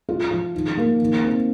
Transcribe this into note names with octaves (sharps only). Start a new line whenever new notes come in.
F4
F3
D#3
A#3
D#3
C4